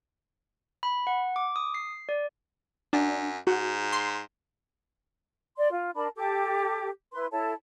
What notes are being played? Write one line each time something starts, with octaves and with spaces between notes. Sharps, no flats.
B5
F#5
D6
D#6
C7
D5
F#2 D4
G#2 F#4
C6
D5 C6
F4
D4 A#4 A5 B5
G4 A4 D6
E4 B4 C6
E4 A4 C#5 A5